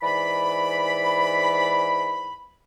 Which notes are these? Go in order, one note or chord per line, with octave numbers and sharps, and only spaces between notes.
G#2 E3 D5 B5